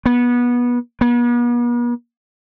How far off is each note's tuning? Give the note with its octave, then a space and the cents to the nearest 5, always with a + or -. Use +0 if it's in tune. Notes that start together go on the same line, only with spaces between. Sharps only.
B3 -25
B3 -45